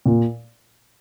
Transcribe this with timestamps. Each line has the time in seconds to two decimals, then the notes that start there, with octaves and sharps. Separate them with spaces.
0.06 A#2